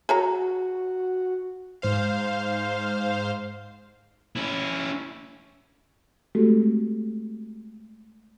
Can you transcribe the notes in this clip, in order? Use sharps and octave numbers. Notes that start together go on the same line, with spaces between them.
F#4 G#4 C#5 A#5
G#2 C5 F5
C#4 E4
G#3 A3 C4 F#4 G4 A4